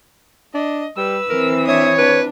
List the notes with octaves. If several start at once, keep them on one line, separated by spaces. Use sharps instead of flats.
D4 D#5
G3 B4 E6
E3 C4 A#4
D4 C#5 E5 D#6
D4 B4